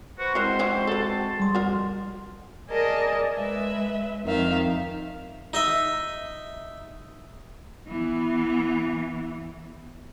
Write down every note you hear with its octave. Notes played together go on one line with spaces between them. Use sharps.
F#4 B4 C5
G#3 C4 E4 F#4 A#4 C5
E3 F3 E4
A4 B4 A5
G3 G#4 C6
F2 F#4 A#4
G#4 A#4 D5 D#5 A5
G#3 B4 E5
F2 D#3 E5 F5
D#4 D#5 E5
E3 B3